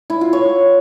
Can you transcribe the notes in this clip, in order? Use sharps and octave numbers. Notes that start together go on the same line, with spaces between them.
E4
F4
C#5